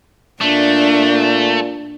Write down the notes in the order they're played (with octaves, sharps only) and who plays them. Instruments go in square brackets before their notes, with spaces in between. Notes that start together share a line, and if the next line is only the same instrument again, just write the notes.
[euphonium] A#2 [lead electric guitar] A3 [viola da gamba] D4